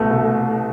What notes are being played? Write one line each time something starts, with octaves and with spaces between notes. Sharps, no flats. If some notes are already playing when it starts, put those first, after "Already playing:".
Already playing: C2 B2 A3
A3